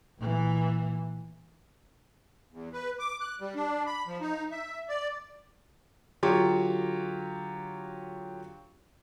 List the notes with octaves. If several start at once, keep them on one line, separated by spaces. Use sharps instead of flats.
A#2 E3
E2
B4
D6
F#6
G3
D4
B5
F3
D#4
E5
D5
D3 F#3 F4 G4 C#5